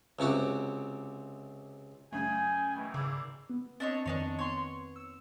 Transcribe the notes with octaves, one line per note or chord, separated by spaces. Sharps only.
C#2 C3 C4 F#4
F#2 C#3 A3 G5 G#5
B2 D#3 E3
G#1 C#3 E6
B3
C4 D4 D#4 C#5
F2 D#3 B3 D4 D#4 C#5
B3 C#5 C6
E6